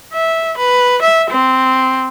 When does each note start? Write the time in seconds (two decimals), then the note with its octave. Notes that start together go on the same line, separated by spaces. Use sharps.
0.13 E5
0.58 B4
1.02 E5
1.30 C4